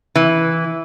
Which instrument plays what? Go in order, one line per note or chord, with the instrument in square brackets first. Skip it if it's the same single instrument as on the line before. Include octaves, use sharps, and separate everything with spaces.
[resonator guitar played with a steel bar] E3